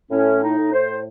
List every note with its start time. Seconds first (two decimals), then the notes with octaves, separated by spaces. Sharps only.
0.11 A2 C#4
0.42 D#4
0.57 A2
0.72 C5